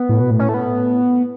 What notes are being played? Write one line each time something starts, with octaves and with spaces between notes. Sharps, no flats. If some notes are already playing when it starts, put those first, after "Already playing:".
Already playing: B3
A2
B2
A2
C#4
A3
B3